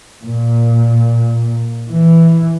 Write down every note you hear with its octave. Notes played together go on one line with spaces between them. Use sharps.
A#2
E3